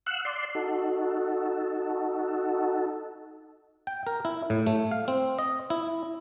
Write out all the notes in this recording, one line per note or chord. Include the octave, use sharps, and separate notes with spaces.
F5 F#5 E6 F#6
D5 C6
D#4 F#4 A4
G5
A#4
E4
A2
A3
F5
C4
D#5
E4